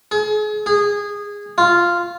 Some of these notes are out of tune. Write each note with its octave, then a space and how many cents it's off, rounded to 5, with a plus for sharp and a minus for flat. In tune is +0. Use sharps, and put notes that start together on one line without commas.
G#4 +35
G#4 -20
F4 -5